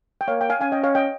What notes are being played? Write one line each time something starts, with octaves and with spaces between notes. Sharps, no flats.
G5
A#3 C#5 F5
G5
F5 G#5
C#4 F5 G#5
D#5 G5
C#5 F5
D#5 G5